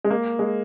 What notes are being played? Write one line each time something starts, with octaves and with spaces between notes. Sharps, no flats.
G#3
A#3
G#3